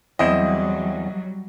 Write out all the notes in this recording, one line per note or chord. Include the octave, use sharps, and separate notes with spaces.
E2 F#3 G3 C4 E4 D#5